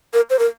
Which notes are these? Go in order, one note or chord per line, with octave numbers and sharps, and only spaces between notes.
A#4
C5
A#4